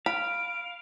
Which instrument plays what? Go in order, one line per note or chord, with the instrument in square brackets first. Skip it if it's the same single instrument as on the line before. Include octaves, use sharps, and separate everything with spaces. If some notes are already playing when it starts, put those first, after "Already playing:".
[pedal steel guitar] F5 [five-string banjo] B5 [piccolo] D7